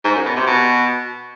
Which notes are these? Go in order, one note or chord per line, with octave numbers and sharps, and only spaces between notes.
G#2
F#2
B2
C3
B2